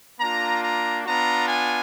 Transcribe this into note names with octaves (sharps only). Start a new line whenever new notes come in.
A#3 D4 F4 A#5
A#5
B3 D4 F4 A#5
G#5